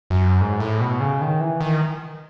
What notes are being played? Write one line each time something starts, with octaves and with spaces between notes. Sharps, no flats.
F#2
G#2
A2
B2
C#3
D#3
E3
D#3